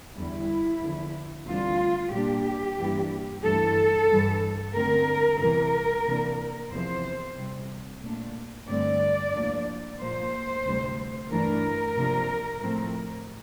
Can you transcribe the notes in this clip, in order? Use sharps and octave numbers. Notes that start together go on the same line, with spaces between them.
E2 D3 G3 E4
E2 D3 F3
D2 C3 E3 G3 D4 F4
A#2 G3 A#3 D4 G4
G2 E3 A#3 D4
G2 E3 A3 A4
G2 E3 G3
D2 D3 A3 C4 A#4
E2 C3 E3 G3 A#4
C3 E3 A#3 D4
E2 C3 F3 C5
C3 G3 C4
A#2 A3 D4
G2 D3 A3 C4 D5
A2 F3 A#3 D4
A#2 F3 A#3 C5
D2 C3 G3
G2 E3 A3 D4 A#4
C3 F3 A#3 D4
A2 F3 A3 C4